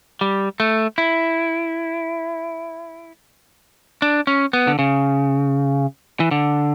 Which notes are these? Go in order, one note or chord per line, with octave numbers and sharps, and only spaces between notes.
G3
A3
E4
D4
C#4
B3
D3
C#3
E3
D3